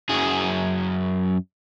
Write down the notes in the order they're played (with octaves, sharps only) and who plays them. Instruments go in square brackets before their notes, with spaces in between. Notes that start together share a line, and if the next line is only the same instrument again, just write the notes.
[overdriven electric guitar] F#2 G#4